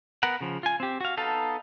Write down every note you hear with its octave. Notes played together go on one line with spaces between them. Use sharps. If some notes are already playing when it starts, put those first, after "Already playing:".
B3 A#4 F#5
C#3 F3
F4 G#5
C4 G4
F#4 F5
B3 D#4 A4 F5 A5